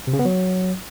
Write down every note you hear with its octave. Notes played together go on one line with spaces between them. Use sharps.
C3
C#3
B3
F#3